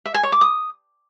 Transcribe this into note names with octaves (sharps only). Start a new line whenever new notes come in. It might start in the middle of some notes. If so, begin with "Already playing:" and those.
E5
G#5
C#5
D6
D#6